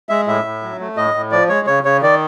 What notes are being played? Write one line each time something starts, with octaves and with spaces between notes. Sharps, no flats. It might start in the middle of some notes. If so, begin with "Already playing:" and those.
G#3 E5
A2 E5
A2
F#3
A3
A2 D#5
A2
F3 D5
G#3 C#5
C#3 C#5
C#3 C#5
D#3 D5